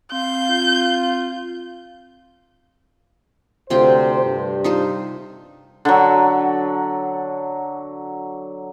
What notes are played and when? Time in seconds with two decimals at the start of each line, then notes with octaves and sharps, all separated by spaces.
0.12 C4 F5 G6
0.50 F4
3.70 D2 C3 F4 C5 G5
4.23 G2
4.64 D#4 F4 C5
5.85 D3 F#3